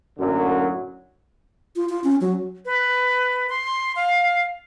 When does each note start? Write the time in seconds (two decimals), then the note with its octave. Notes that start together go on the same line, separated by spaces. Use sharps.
0.19 F#2 A2 D3 F#3 A#3
1.76 F4
1.89 F4
2.04 C#4
2.21 F#3
2.65 B4
3.49 C6
3.96 F5